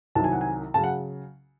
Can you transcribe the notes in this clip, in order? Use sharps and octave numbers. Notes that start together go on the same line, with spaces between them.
C2 C3 D#3 F#3 A5
G#5
F#5
G#5
C#3 F#3 A5
F#5